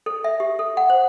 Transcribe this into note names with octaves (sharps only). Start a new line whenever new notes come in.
A4
E5
G4
A4
F#5
C5